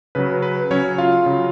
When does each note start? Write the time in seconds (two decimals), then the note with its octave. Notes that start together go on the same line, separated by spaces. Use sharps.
0.15 C#3 F#3 B4
0.42 B4
0.71 C#3 F#3 C#4 C#5
0.98 F4 F5
1.26 C#3 F#3